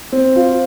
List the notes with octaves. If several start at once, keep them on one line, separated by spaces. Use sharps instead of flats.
C4
F4